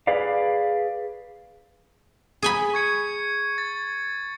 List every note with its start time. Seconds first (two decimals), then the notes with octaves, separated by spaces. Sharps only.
0.07 G#4 B4 D5 F5
2.42 G#4 G#5 B5
2.74 C#6 G#6 C#7
3.58 A6